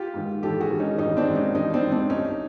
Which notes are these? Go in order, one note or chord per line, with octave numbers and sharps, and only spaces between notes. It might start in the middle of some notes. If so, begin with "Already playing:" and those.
Already playing: F4 G4
G#2 D#3
A1 G4 A4
F#4 G#4
G#2 D#3
C#4 D#4
A1 C#4 D#4
C4 D4
G#2 D#3
C#4 D#4
A1 C#4 D#4
C4 D4
G#2 D#3
C4 D4
C2 C#4 D#4